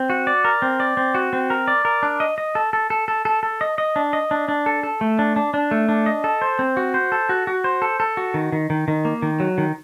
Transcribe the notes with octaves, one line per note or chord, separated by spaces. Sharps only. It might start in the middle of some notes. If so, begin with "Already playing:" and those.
Already playing: C4
F#4
D5
A#4
C4
D5
C4
F#4
C4
A#4
D5
A#4
D4
D#5
D#5
A4
A4
A4
A4
A4
A4
D#5
D#5
D4
D#5
D4
D4
A4
A4
A3
D4
D4
D4
A3
D4
D#5
A4
C5
C4
F#4
C5
A4
F#4
F#4
C5
A4
A4
F#4
D#3
D#3
D#3
D#3
A#3
D#3
F#3
D#3